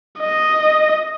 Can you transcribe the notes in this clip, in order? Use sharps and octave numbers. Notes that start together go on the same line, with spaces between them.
D#5